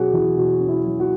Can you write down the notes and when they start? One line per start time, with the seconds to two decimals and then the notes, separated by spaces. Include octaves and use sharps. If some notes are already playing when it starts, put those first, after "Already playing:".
Already playing: B2 F#3 C#4 F#4 G#4
0.13 E2 E4
0.37 B2 F#4
0.60 C#4
0.68 E4
0.84 F#3
1.00 F#4